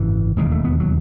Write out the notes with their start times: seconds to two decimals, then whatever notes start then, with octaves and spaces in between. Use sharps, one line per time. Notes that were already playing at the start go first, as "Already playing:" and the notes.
Already playing: G#1 F#2 C#3 E3
0.37 E1 D#2 C#3 G#3
0.51 A3
0.65 B3
0.80 F#3